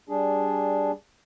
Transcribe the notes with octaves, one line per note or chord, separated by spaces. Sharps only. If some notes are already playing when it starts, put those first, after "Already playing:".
G3 D4 G#4